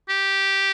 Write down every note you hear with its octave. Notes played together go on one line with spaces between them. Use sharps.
G4